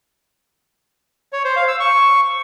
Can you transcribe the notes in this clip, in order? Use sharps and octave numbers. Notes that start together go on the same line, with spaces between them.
C#5
C5
F5
E6
C#6